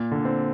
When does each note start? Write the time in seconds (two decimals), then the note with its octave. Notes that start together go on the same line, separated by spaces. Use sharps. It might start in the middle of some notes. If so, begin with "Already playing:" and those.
Already playing: A#2
0.11 D3
0.25 C4